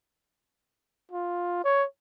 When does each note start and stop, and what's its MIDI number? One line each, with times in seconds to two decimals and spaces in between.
1.11 1.64 65
1.65 1.85 73